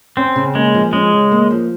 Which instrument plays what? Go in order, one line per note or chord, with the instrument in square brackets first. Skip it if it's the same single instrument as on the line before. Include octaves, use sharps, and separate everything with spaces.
[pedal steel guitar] C4 [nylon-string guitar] C#4
[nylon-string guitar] C#3
[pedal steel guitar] G#3 [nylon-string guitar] A#3
[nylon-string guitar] F3
[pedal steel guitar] G#3 [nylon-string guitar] C#4
[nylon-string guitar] C#3
A#3
F3